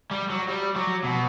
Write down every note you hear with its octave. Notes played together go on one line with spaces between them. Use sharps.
G3
F#3
G3
F#3
B2